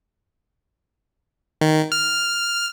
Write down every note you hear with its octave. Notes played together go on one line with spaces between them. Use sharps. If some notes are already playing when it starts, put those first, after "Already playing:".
D#3
F6